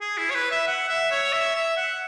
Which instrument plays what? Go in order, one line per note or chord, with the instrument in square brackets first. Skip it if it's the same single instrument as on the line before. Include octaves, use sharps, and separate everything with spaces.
[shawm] G#4
E4
C#5
B4
E5
F#5
E5
C#5
E5
E5
F#5